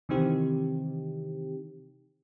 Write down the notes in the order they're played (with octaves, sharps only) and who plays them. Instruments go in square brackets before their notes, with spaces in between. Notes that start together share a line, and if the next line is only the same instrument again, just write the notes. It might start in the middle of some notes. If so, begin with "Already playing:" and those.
[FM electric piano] C3 D#3 E3 C4 D#4 G4